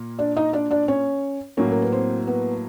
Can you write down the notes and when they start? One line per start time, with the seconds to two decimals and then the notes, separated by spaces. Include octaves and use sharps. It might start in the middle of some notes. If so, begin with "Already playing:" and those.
Already playing: A#2 A#3
0.19 D4 D5
0.37 D#4 D#5
0.53 D4 D5
0.71 D4 D5
0.88 C#4 C#5
1.57 A2 F#3 A#3 C#4 C#5
1.72 A#4
1.82 B4
1.92 C4 C5
2.27 B3 B4